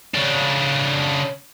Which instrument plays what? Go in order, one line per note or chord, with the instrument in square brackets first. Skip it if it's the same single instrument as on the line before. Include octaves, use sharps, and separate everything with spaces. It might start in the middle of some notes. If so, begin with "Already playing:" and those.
[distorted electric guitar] C#3 D4